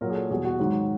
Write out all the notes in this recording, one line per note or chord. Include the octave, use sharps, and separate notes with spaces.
A#2 F#3 A#4
G#4
A4
E2 B2 G3 G#4
F#4
G#2 D#3 F#3